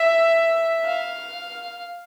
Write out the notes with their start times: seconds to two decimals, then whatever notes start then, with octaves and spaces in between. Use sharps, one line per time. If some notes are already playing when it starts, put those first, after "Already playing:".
Already playing: E5
0.85 F5